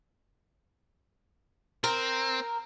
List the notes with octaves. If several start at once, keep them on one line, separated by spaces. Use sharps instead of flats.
C4 A#4